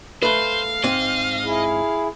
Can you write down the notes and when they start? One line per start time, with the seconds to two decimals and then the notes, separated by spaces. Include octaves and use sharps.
0.22 A3 B4 C5 F5
0.83 G#2 C4 D#5
1.44 E4 G#4